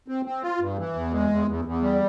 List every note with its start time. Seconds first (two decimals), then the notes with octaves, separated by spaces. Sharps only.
0.08 C4
0.25 C4
0.43 F4
0.60 G2
0.78 E3
0.95 E2
1.12 G#3
1.30 E2
1.47 E2
1.65 E2
1.82 G3